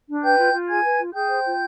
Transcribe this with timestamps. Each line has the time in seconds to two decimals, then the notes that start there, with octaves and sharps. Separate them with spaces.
0.08 D4
0.23 B4 G5 G6
0.38 F4
0.53 F4
0.68 G#4 G#5 G#6
0.84 B4
0.99 F4
1.14 G#4 G5 G6
1.29 C5
1.45 F4